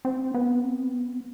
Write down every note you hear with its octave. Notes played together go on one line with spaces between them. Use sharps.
C4
B3
C4
B3